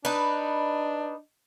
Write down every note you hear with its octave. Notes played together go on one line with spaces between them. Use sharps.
D4 D#4 B4